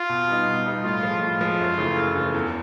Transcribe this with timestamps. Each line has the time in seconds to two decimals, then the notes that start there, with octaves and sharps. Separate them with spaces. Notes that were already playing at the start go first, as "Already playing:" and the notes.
Already playing: F4
0.09 B2
0.28 G3 B3 D#4
0.47 B2
0.66 G3 B3 D#4
0.84 A2 F4
1.03 F3 G#3
1.21 A2 F4
1.41 F3 G#3
1.59 F#2
1.78 C#3 E3 A3
1.97 F#2
2.15 C#3 E3 A3
2.34 E2